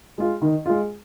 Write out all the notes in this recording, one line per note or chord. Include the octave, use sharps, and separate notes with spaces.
G#3 F4
D#3
G#3 F4